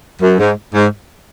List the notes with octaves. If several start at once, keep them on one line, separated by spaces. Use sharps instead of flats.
F#2
G#2
G#2